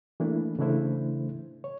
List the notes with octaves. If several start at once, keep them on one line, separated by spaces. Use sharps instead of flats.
E3 A3 A#3 D4 E4
C#3 E3 A3 D4 E4 C5
C#5